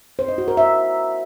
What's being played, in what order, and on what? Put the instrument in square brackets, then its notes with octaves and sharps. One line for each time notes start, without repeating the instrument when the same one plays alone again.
[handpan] C5
D#5
F#4
A#4
E5